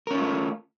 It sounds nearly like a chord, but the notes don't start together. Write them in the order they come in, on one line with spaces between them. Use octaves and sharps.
A#4 C#4 D4 F4 A3